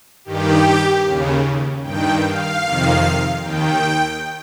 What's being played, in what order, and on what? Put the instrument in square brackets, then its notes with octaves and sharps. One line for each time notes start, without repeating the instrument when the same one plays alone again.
[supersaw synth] G2 D#3 G4
D#2 C#3
G2 D#3 G5
F5
F2 C3 D#3
D#2 D#3 G5